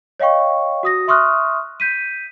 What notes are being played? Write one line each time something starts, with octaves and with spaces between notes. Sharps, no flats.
C#5 D#5 F5 G5 C#6
F#4 D#6 A#6
E5 C6 C#6 D#6 F6 F#6
G6 B6 D#7